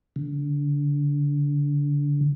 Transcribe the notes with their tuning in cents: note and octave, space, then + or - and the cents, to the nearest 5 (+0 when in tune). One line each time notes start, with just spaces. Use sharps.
D3 -25